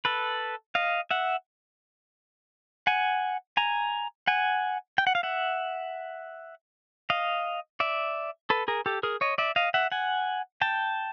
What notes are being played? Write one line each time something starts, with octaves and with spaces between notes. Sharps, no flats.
A4 B4
D#5 F5
E5 F#5
F#5 G#5
G#5 A#5
F#5 G#5
G5
F#5
F5
E5 F#5
D#5 F5
D5 E5
A4 B4
G#4 A#4
G4 A4
G#4 A#4
C#5 D#5
D5 E5
D#5 F5
E5 F#5
F#5 G#5
G5 A5